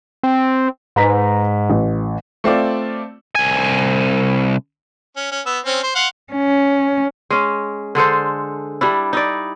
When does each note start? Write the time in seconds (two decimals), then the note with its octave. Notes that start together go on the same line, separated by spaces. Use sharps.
0.23 C4
0.96 G#2 B4 A#5 B6
1.70 A1
2.44 A3 C4 F4 D5
3.35 C2 G#5
5.17 C#4
5.32 C#4
5.46 B3 E6
5.66 C4 C#4
5.83 C5
5.95 F5 F#5 C6
6.33 C#4
7.30 G#3 C#4
7.95 D3 G#3 A4 C5
8.81 G3 D4 E4
9.13 D#4 E4 D5